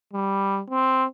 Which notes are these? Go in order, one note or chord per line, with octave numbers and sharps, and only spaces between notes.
G3
C4